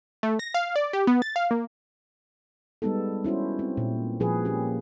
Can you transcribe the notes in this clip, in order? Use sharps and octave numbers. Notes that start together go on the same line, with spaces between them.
A3
A#6
F5
D5
G4
B3
A6
F5
A#3
G3 G#3 B3 D#4 A4
C#4 E4 F#4 C5
C4
A#2
A#2 F3 G#4 B4
A#3 C#4 G4